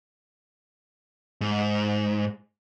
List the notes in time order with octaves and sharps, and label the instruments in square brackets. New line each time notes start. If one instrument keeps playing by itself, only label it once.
[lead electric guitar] G#2